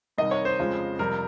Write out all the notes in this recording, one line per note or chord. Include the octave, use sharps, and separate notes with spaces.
C2 C3 D#3 G3 D#5
C#5
C5
F2 C#3 F3 G#3
F2 C3 G3 A#4